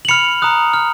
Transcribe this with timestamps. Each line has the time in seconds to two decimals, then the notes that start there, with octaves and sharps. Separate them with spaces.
0.05 F#7
0.08 B5 F6 C#7 F7
0.42 A#5 D#6 F#6
0.74 F6